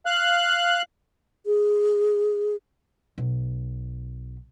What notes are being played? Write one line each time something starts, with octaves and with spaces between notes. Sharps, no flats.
F5 F#6
G#4
B1